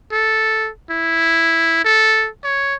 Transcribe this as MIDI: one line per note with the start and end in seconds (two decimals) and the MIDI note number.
0.12 0.69 69
0.91 1.80 64
1.85 2.28 69
2.44 2.75 73